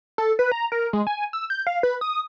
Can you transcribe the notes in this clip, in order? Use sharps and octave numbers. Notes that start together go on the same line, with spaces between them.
A4
B4
A#5
A#4
G#3
G#5
E6
G6
F5
B4
D#6